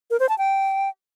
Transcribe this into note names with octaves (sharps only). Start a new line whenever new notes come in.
A#4
C5
A5
G5